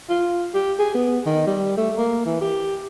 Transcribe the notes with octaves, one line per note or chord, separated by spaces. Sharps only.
F4
G4
G#4
B3
D#3
G3
A3
A#3
E3
G4